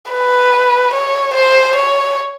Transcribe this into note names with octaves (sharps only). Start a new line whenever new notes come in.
B4
C#5
C5
C#5